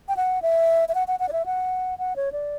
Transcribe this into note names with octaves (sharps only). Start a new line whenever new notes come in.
G5
F#5
E5
E5
F#5
F#5
F#5
D5
E5
F#5
F#5
C#5
D5